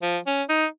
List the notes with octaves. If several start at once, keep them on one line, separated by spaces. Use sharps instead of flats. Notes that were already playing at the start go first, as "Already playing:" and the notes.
F3
C#4
D#4